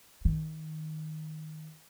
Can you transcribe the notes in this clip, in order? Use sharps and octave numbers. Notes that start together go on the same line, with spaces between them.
D#3